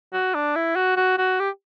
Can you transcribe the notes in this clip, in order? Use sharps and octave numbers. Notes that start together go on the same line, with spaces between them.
F#4
D4
E4
F#4
F#4
F#4
G4